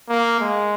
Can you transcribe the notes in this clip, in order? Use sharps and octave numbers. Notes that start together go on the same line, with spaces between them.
A#3
G#3